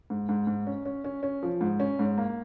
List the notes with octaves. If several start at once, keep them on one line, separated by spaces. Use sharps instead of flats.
G#2
G#2
G#2
C#4
C#4
C#4
C#4
F3
G#2
C#4
G#2
A#3